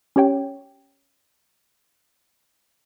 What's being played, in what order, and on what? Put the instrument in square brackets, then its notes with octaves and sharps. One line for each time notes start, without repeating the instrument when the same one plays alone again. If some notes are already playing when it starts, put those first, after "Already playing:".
[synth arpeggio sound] C#4 G4 C#5 G5